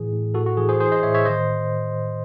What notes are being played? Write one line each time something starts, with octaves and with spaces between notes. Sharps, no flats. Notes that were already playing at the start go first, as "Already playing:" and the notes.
Already playing: A2 E3 G#4
A2
A2 F#4 A4
F#4
E3 G#4
G#4 C5
E3 G#4 C5
C5 D#5
A2 C#5 E5
C#5 E5
D#3 C5 D#5